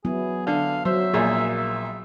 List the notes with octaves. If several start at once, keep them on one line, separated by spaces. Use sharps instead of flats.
F#3 B3 E4 G#4
D3 F5
F#3 C5 E5
A#1 A#2 G#4
E5